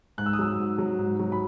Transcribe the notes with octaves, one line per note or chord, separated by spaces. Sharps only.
G#2 F#6
E6
D#6
F#3 E6
G#2
F#3
G#2
F#3
B5